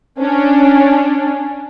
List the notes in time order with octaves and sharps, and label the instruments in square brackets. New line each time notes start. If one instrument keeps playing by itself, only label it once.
[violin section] C#4 D4